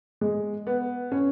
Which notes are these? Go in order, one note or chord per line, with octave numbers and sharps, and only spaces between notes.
G#3
B3
C#4